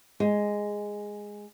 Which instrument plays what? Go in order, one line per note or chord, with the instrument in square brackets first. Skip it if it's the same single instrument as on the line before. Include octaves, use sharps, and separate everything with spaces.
[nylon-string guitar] G#3